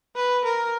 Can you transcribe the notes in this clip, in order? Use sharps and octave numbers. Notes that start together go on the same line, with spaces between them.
B4
A#4